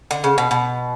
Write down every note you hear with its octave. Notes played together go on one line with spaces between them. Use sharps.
D3
C#3
B2
B2